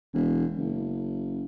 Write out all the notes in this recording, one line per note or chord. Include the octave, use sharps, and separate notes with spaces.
E1
F#1